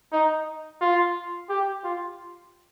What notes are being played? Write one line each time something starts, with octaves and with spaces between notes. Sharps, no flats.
D#4
F4
G4
F4